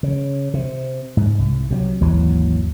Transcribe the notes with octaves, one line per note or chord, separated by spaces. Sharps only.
C#3
C3
G#2
C2
C3 E3 F#3
G#1 D#2 E3 F#3